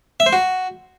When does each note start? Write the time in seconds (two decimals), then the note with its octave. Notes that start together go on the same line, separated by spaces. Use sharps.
0.20 E5
0.26 C5
0.33 F#4